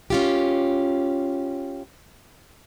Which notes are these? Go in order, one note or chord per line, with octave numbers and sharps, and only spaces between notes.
C#4 F4 G4